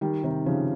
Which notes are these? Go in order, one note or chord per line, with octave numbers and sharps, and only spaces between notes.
D#3 G3
C3 D#3
C#3 F3